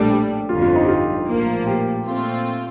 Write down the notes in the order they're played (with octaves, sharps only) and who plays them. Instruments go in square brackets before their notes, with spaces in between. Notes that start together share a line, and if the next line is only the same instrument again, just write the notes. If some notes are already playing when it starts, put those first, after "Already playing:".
Already playing: [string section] A#1 A2 G3 D4 [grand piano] A4
[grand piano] G4
[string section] G1 F2 D3 [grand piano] F4
[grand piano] F4
D#4
G4
F4
[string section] A#1 A2 F3 A#3
[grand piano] G4
[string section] A#2 A3 C4 F4